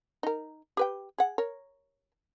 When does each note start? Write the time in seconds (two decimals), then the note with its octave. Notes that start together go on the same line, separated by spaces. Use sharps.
0.23 D#4 A#4
0.77 G4 B4 G5
1.18 G#4 F#5
1.38 A#4 C#5